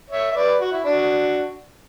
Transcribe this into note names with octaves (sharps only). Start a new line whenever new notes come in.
C#5 E5
E5
B4 D5
F#4
E4
D4 F#4